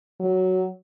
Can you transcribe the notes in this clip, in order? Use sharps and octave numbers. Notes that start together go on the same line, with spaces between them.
F#3